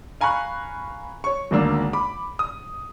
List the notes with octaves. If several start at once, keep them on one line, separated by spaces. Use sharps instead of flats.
F5 G#5 A#5 B5 C#6 F#6
C#5 C#6
G#1 D2 A#3 D4 E6
B5 D6
D#6